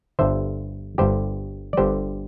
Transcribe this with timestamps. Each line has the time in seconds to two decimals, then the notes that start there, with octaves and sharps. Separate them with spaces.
0.19 G1 G2 D3 C5 E5
0.98 G1 G2 D3 G4 C5
1.73 D5
1.77 G1 G2 D3 G4 C5